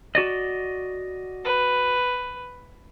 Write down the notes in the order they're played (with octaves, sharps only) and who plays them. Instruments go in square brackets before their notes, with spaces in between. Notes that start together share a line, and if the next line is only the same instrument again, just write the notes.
[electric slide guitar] F#4 D5 D#5
[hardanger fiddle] B4